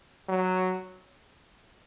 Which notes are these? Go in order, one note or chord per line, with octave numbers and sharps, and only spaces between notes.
F#3